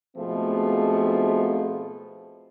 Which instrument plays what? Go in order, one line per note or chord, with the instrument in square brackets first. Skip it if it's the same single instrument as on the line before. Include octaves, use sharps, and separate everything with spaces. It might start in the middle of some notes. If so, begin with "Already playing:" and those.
[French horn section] G#2 B2 F3 A3 C4 G#4